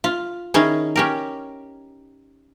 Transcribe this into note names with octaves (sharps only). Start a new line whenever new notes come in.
F4
D#3 C#4 D#4 E4 G#4
C#4 G4 A#4